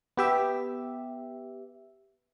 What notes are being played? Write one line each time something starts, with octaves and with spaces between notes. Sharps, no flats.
B3 G4 E5